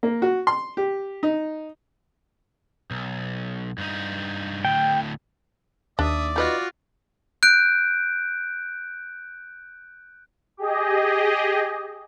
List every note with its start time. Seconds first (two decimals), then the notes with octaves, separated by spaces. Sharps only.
0.03 A#3
0.22 F#4
0.47 C6
0.77 G4
1.23 D#4
2.91 B1
3.78 G2 D#4
4.65 D2 A2 G5
5.99 D#2 D4 D5 E5 D#6
6.36 D#4 F4 F#4 B4 D#5
7.43 F#6 G6 D7
10.57 G4 G#4 D#5